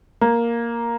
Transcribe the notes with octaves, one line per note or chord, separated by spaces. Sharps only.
A#3